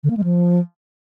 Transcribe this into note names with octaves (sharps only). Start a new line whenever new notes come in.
D3
A#3
G#3
F3